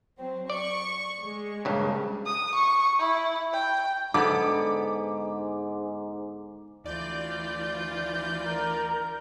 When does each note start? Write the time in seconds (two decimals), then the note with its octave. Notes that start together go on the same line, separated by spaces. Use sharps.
0.18 F#3 C4
0.50 D5 C#6
1.23 G#3
1.65 A#1 G2 C#3
2.26 D#6
2.55 C#6
2.99 E4
3.53 G5
4.14 G#2 D3 B3 D6
6.84 D2 E3 F4 D5 G6
8.48 A#4